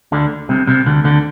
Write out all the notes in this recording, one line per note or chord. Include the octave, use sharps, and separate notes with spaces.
D2 D3
C2 C3
C2 C3
D2 D3
D2 D3